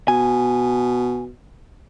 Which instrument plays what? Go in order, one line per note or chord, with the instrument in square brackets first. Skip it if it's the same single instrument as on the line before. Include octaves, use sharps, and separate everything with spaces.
[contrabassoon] B2 [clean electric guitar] G#5